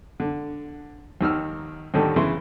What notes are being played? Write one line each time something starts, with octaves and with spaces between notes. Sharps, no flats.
D3
D#2 D#3 E6 F6
D#2 A2 D3 D#3 G3 A4
C#3 E3 E4 C6